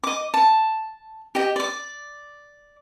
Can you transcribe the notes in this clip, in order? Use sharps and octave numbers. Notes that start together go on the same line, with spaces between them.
D#5 D6
A5
G4 D#5
D5 D6